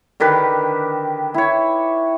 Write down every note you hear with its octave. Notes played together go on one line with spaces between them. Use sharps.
D3 D#3 G4 B4
E4 C#5